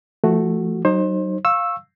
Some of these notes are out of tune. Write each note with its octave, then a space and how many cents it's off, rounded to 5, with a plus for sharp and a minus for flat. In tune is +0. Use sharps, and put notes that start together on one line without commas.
F3 -35 A3 +0 F#4 +0
F#3 +30 D#4 -15 C5 +25
F5 +5 C#6 -25 E6 +0